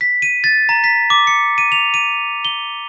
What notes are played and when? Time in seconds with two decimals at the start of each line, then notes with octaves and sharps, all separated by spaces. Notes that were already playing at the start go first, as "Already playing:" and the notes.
0.01 B6
0.22 D#7
0.44 A6
0.69 A#5
0.84 B6
1.10 D6
1.27 C#7
1.58 D#7
1.72 F7
1.94 D#7
2.45 G7